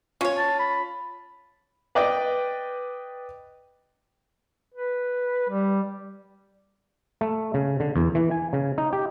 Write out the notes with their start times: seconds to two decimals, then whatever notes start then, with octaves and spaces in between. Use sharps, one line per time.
0.21 C#4 F4 C#5
0.37 A5
0.59 B5
1.95 B4 D5 D#5 G5
4.74 B4
5.49 G3
7.21 A3
7.54 C#3
7.80 D3
7.96 E2
8.15 E3
8.31 G#5
8.53 C#3
8.78 D#4
8.93 G4